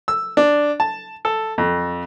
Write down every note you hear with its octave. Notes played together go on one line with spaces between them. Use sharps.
E6
D4
A5
A4
F2